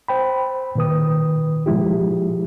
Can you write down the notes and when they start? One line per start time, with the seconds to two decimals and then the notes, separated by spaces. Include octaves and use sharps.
0.08 C5 G5 B5
0.75 A#2 D#3 B4 D#6
1.66 A#2 F3 G#3 E4 G4